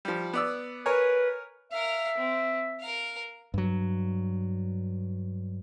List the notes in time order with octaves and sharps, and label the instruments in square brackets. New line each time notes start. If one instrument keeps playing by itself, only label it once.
[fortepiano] F3 G3
B3 D5 E6
[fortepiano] A#4 C#5 G#5 [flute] B4
[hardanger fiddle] A#4 F5 [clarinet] E5
[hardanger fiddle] C4
A#4 F5
[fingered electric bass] G2 F#3